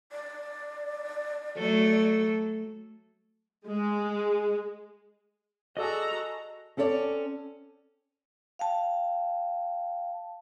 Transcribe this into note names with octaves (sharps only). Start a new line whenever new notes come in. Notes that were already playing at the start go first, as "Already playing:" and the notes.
D5
F#3 A3 A4
G#3
F#4 G#4 A4 D5 D#5 A#5 E6
C4 C#4 A4 C#5 D5
F5 G5 A5